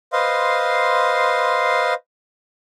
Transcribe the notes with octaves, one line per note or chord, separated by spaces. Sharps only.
B4 C5 D#5 F5 C6